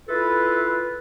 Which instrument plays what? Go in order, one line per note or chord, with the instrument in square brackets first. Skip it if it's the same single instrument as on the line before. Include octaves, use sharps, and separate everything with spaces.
[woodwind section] E4 F4 A4 B4